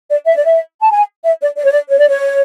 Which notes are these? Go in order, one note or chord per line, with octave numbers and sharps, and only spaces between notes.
D5
E5
D5
E5
A5
G#5
E5
D5
D5
C#5
D5
C#5
D5
C#5